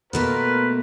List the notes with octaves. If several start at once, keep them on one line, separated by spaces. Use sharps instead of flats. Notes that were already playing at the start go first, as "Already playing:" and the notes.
B2 A3 A#3 F4 A#4 B4